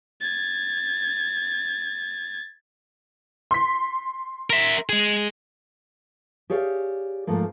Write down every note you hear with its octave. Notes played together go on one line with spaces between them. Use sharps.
G#6 A6
C6 B6
A#4 E5
G#3 G#4
G4 G#4 C#5 D5 F5
G#2 F3 A3 A#3